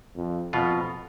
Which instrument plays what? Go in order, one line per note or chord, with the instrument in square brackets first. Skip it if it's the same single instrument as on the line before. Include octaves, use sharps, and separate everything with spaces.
[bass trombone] F2
[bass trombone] F2 [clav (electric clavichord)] B2 B3 F4